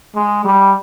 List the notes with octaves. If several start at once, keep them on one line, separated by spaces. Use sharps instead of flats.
G#3
G3